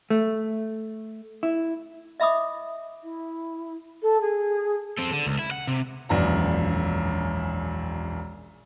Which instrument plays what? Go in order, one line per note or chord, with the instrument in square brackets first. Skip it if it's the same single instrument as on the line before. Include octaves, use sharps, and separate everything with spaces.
[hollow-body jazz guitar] A3
E4
[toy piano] D#5 E5 B5 D6 D#6
[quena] E4
A4
G#4
[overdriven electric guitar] C4 A4
D3
C#2
E4
F#5
C3
[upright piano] E1 A#1 F#2 A#5